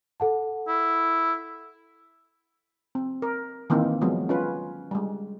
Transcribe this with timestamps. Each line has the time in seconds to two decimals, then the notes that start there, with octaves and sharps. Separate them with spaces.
0.20 A4 F#5 A5
0.68 E4
2.95 C4
3.22 A#4
3.70 D#3 E3 A#3 C4 D#4
4.01 F3 F#3 G#3 B3
4.29 C#4 F4 B4
4.91 G3 G#3